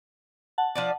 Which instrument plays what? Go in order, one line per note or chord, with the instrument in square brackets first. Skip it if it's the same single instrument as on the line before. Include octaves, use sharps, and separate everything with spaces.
[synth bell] F#5 A5
[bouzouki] F3 D4 D5